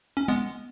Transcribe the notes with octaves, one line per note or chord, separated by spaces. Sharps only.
C#4
G#3 B3